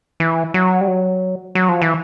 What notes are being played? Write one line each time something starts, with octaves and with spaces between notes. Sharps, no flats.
E3
F#3
G3
F#3
F#3
F3
E3